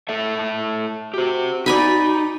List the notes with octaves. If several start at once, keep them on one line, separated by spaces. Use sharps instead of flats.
A2 A4 E5
F#4 G4 C5
D#4 D5 G#5 B5